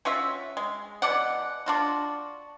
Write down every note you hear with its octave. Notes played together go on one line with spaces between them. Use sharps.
C#4 F4 F#4 E5
G#3
B2 E3 D5 F#5
D4 F4 F#4